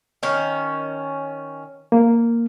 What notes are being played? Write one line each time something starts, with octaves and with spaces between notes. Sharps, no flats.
D#3 C#4
A#3